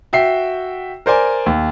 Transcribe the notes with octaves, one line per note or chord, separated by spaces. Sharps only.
F#4 E5 G5 C7
A#4 C5 D5 G#5
D#2